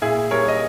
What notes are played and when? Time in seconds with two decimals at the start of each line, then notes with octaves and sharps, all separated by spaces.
0.02 A#2 E4 G#4
0.31 G3 A#4 C#5
0.48 D#5